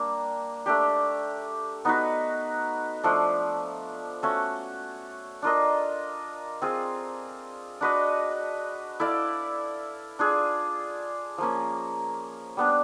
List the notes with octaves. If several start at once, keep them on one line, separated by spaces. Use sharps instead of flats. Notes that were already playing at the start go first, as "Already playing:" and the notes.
Already playing: G3 A#3 D4
A3 D4 G4
B3 D#4 F#4 B4
F3 A3 D4
A3 C#4 F#4
D4 F4 A#4 D#5
C4 F4 G#4
D4 F#4 B4 D#5
E4 A4 D5 F5
D4 F4 G#4
F3 A#3 C#4
G3 B3 D4